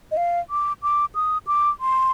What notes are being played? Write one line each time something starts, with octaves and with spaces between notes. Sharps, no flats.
D#5
F5
D6
D6
D#6
D6
C6